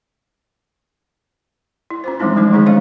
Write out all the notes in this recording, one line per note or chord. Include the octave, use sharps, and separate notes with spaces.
E4
C#4 F4 C5
E3 F3 G3 G#3 C4 D#4
F#3 G#3 A3 D4 D#4
D#3 G#3 C#4 D#4 G#4
D4 C5 C#5 D#5 F5